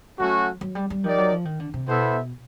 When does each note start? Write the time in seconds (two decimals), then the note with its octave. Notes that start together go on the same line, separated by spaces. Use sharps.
0.19 F#3 A3 C#4 F#4
0.61 F#3
0.75 G3
0.90 G3
1.04 F3 D#4 G4 A#4 D5
1.18 F#3
1.32 F3
1.45 D#3
1.60 D3
1.74 C3
1.88 B2 B3 E4 A4 C5 E5